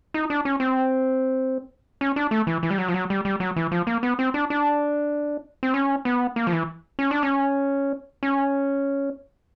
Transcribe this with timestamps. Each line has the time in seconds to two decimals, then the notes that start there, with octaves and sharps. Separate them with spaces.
0.14 D#4
0.30 D4
0.45 C#4
0.60 C4
2.01 C#4
2.16 D4
2.31 A3
2.47 E3
2.63 E3
2.70 G3
2.78 F#3
2.88 F3
2.94 F#3
3.10 G3
3.25 G3
3.40 F#3
3.56 E3
3.72 F3
3.87 A#3
4.03 B3
4.19 C4
4.34 D4
4.50 D4
5.63 C4
5.74 C#4
6.05 B3
6.36 A#3
6.47 F3
6.52 E3
6.99 C#4
7.11 D4
7.23 C#4
8.23 C#4